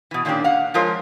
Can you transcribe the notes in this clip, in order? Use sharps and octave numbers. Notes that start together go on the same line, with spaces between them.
B2 E3
A#2 D#3 A#3 C#4 D4 G4
F5 F#5
F3 G#3 F4 A#4 C5 C#5